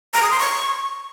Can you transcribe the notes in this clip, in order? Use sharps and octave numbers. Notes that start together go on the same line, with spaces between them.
A#5
D#6
C6
C#6